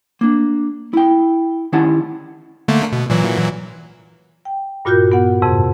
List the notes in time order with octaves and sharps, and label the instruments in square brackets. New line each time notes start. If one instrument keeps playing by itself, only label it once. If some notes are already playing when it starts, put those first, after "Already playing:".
[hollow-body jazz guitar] A#3 D4
E4 G5
D#3 C#4 E4 G4 F#5 A5
[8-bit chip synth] D3 A3 A#3
B2
A#2 E3 F#3
[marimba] G5
G2 A#2 F4 F#4 A#4 G6
B3 F#5
F2 G#2 C3